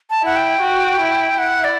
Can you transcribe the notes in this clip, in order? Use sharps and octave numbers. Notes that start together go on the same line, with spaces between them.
A5
E4 F#5
G5
F#4
E4
E4 F#5
D5